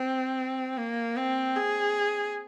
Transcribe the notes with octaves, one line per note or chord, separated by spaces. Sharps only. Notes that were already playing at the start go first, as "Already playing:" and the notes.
Already playing: C4
A#3
C4
G#4